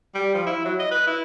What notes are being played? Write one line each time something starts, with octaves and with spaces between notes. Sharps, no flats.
G3
F3
E4
F#3
D#5
B4
E4